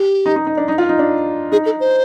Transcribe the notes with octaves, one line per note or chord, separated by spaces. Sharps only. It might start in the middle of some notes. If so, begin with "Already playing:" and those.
Already playing: G4
D#4
D#4
D#4
D4
D#4
F4
D#4
D4
D#4 G#4
A4
C5